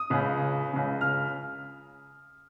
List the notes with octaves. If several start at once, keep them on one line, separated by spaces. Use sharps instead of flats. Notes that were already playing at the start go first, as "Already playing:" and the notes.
Already playing: D#6
C#2 C#3
C#2 C#3
F6